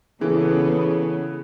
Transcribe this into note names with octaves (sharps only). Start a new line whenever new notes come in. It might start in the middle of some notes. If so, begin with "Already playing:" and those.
C#3 E3 B3 G#4 A4